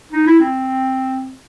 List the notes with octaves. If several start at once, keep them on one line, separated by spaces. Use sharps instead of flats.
D#4
E4
C4